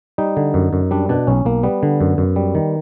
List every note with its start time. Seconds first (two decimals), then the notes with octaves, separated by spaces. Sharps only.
0.18 G3 D#4
0.37 D3
0.54 F#2
0.73 F#2
0.91 G3 D4
1.09 B2 D4
1.27 B1 C#4
1.45 B1 A#3
1.63 G3 B3
1.83 D3
2.01 F#2
2.18 F#2
2.36 G3
2.55 D#3